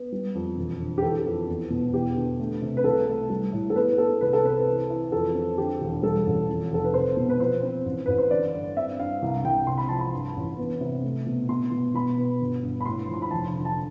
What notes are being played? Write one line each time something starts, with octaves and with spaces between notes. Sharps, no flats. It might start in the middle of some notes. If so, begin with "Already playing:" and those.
Already playing: B3
G3
F2
E1
D3
G4
E3 A4
F2
E2
B2
E2 G4
D3
A3
C3
B4
C2 A4
A3
G3
A2
A4
B3 B4
B3 A4
C2 B4
A4
C4 B4
E3
E3
F2 A4
C4
D3 G4
E1
G3 A4
A1
F2
F1 A4
B4
C4 C5
B2
B4
F3 C5
C4
A1
A1 B4
C5
D3 D5
G2
C4 E5
G2 F5
C2
C2 G5
C3 C6
B5
F3 A5
B5
G2
A1
B3
C3
A3
B2
B2 C6
B2
B2 B5
B3
G1
G2
B5
A2 C6
F3
C6
B5
F1 A5
D3
A5